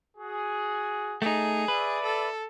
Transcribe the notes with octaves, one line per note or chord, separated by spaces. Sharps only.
F#4 G#4
A3 D#4 G#4
B4 D5 E5
A4